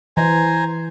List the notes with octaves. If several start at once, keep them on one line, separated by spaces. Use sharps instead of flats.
E3 C5 G#5 A#5